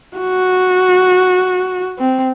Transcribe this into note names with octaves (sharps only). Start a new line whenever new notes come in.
F#4
C4